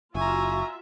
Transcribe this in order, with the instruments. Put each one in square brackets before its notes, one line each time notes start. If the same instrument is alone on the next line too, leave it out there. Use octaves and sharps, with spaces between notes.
[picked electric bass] F#1 [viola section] F4 F#4 E5 [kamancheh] G#5 A#5 [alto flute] C#6